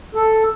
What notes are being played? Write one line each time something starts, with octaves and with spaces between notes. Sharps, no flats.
A4